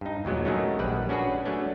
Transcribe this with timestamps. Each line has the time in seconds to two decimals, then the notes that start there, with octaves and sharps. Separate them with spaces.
0.01 G2 D#4
0.25 D#2 A#2 F#3 G#3 B3
0.45 D#3 F#3 G#3 A3 C#4 D#4
0.79 A#1 G3 B4 D5 F#5
1.09 C#4 D4 F#4 G#4 B4
1.45 F#3 A3 C#4 D4